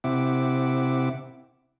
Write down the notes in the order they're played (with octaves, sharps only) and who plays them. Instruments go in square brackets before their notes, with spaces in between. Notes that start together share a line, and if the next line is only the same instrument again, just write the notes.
[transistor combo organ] C3 C4 E4 E5 F#5 D6